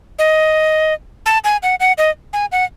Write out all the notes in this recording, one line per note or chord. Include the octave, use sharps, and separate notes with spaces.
D#5
A5
G#5
F#5
F#5
D#5
G#5
F#5